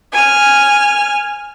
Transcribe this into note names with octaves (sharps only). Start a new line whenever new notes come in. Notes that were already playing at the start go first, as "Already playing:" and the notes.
G#5 F6